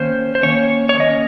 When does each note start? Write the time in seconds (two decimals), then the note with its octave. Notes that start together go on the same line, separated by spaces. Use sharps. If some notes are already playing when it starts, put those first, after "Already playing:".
Already playing: D#3 A#3 C#4 C5
0.35 C5
0.43 D#3 A#3 C#4 C#5
0.89 C#5
1.00 D#3 A#3 C#4 D#5